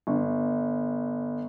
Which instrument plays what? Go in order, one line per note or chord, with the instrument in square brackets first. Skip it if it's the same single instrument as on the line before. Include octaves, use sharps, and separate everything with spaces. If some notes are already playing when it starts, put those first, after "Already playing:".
[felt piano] G1